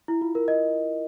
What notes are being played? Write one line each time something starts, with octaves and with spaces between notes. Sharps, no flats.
E4
F4
A#4
D#5